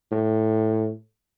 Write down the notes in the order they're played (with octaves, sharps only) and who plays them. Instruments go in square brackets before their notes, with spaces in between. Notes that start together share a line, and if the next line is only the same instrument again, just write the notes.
[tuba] A2